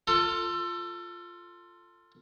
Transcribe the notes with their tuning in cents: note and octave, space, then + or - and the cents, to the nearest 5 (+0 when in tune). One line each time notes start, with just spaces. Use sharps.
F4 +0 A4 +25